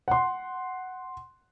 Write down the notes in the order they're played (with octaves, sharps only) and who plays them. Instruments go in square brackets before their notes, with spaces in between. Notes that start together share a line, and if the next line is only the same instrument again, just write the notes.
[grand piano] F#5 C6